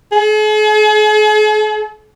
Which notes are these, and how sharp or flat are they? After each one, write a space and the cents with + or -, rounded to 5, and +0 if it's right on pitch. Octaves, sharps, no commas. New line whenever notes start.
G#4 +45